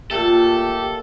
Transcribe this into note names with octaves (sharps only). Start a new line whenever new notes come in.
A#2 A3 G4 A4 A5